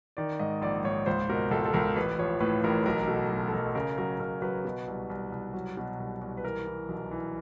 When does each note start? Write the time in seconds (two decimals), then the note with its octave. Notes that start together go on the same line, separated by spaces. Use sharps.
0.17 D#3 D5
0.39 G#2 D#5
0.61 A#1 D5
0.84 G#2 C#5
1.06 C#2 C5
1.29 B2 A#4
1.51 C#2 A4
1.65 A4
1.73 C#2 A#4
1.96 A1 B4
2.18 F3 C#5
2.40 A2 B4
2.64 A1 A#4
2.86 B1 A#4
3.08 B2 A4
3.31 B1
3.48 A4
3.52 B1 A#4
3.75 C#3 A#4
3.98 F#3 A#4
4.20 C#3 A#4
4.42 F#3 B4
4.65 B2
4.88 C2
5.09 C2
5.32 C2
5.54 F#3
5.77 B2
6.00 C2
6.21 C2
6.37 B4
6.44 E3 A#4
6.67 E3
6.89 B1
7.11 E3